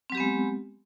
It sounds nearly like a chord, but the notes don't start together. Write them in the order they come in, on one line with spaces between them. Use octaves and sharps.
C4 F#3 G4 B3 G#3